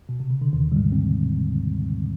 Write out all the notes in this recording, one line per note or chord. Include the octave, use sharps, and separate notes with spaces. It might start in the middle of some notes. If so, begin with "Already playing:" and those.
B2
C3
C#3
D3
D#2 D#3
G3
G#2 G#3
C4